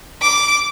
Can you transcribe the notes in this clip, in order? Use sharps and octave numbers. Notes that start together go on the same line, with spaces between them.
D6